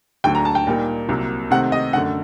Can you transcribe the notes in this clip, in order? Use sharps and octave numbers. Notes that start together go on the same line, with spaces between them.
D2 D3 F#3 A3 G5
A#5
A5
G5
A#2 G3 A#3 D#4
C2 C3 F#3 A#3
C3 D#3 A3 C4 D#4 F#5
D#5
F#2 D3 A3 F#5